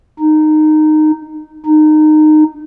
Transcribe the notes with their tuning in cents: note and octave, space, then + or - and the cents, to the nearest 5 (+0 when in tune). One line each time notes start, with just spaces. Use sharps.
D#4 -15
D#4 -20